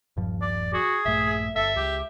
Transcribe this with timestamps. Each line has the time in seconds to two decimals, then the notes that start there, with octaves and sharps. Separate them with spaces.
0.17 D#1 G2 F3
0.41 D5
0.73 F#4 G#4
1.05 A#1 G2 A3 E5
1.56 G1 A4 E5
1.76 C#2 G4